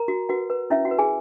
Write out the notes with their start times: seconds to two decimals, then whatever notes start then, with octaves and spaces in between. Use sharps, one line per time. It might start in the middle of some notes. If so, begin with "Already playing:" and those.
Already playing: A#4 A#5
0.08 F#4
0.29 F#4 B4 F#5
0.50 B4
0.70 C#4 E4 E5
0.85 F#4 F#5
0.91 B4
0.99 G#4 G#5